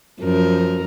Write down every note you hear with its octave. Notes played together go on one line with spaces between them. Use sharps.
F#2 F3 A#4